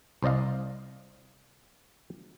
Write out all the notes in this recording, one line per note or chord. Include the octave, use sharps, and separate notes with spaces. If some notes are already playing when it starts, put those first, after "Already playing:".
C2 C5 D5 D#5 F5